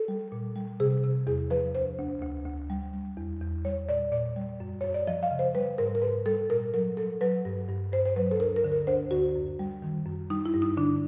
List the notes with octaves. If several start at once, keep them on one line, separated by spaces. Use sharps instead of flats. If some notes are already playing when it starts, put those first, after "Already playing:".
Already playing: A4
G3
A#2
G3
C3 G#4
C3
E2 G#4
F3 B4
D2 C5
D2
D2
D2
G3
G3
E2
E2
G3 C#5
A#2 D5
A#2 D5
G3
F#2
F#2 C#5
D5
F3 D#5
F5
C#3
C5
G3 B4
G#2 A#4
A#4
G#2 B4
G3 A4
A#2 A#4
F#3 A#4
F#3 A4
F#3 B4
G2
G2
G2 C5
C5
F#3 B4
A4
D2 A#4
A#4
D3
A#4
D2 C5
D3 F#4
F#2
G3
D#3
F#2
G3 D#4
E4
G2
D#4
D3 D4